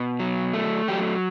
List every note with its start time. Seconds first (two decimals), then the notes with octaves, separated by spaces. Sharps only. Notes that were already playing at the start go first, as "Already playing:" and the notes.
Already playing: B2
0.19 F#3
0.53 A3
0.88 F#3 G4